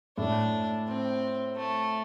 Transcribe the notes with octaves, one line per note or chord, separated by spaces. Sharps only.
A2 D4
C4
A3